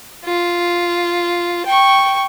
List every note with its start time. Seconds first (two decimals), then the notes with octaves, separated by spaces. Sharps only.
0.25 F4
1.66 G5 C#6